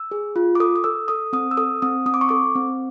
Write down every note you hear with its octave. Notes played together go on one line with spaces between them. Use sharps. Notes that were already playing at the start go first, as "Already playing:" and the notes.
Already playing: E6
G#4
F4
D6
A4 D#6
D#6
A4 E6
A4 D#6
C4 D#6
E6
A4 D#6
C4 D#6
C4 D#6
D6
C#6
A4 D6
C4